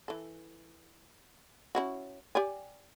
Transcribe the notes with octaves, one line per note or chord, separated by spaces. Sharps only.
E3 A4
C#4 E4 F#4
G4 D5 G#5